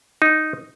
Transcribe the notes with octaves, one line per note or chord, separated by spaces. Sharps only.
D#4